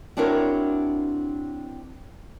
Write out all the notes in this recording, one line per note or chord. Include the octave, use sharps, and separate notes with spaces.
C4 D4 E4 F#4 A#4 C#5